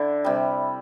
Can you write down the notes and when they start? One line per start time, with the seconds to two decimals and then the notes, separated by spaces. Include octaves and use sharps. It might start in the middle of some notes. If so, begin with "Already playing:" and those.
Already playing: D3 D4 E4
0.24 C3 G3